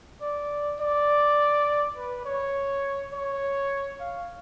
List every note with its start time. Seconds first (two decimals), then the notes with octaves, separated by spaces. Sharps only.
0.21 D5
0.80 D5
1.96 B4
2.25 C#5
3.13 C#5
4.00 F5